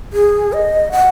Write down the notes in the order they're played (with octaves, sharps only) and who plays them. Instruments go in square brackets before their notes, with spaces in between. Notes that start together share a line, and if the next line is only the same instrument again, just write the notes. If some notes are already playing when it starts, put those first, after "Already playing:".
[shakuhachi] G#4
D#5
F#5